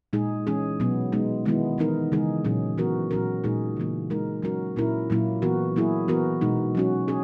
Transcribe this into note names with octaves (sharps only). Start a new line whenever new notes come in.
A#2 G#3 D#4 G#4
E3 G#3 C#4 G#4
B2 F#3 B3
G#3 B3 D#4
D#3 G#3 B3 E4
E3 B3 D#4 A#4
C#3 E3 G#3 D#4 G#4
A#2 F#3 C#4 G#4
E3 B3 F#4 A#4
A#2 F#3 C#4 F#4 A#4
A#2 G#3 D#4 G#4
C#3 E3 A#3
G#3 D#4 A#4
F#3 C#4 F#4 A#4
A#2 A#3 C#4 E4 A#4
A#2 F#3 A#3 E4
E3 B3 F#4 A#4
F#3 A#3 E4 G#4
E3 B3 F#4 A#4
B2 G#3 D#4
F#3 C#4 F#4
C#4 G#4